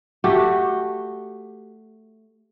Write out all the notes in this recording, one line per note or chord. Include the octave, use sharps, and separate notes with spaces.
A3 F#4 G4